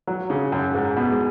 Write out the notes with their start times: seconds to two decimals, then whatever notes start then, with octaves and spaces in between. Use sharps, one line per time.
0.07 F#3
0.30 C#3
0.52 F#2
0.74 G#2
0.96 B2
1.11 G#3